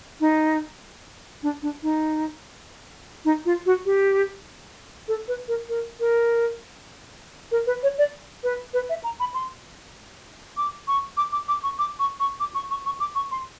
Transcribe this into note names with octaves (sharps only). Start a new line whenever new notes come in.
D#4
D4
D4
D#4
D#4
F4
F#4
G4
A4
B4
A#4
A#4
A#4
A#4
B4
C#5
D5
B4
B4
E5
A#5
B5
C6
D6
C#6
D6
D6
D6
C#6
D6
C#6
C#6
D6
C#6
C#6
C#6
D6
C#6
C6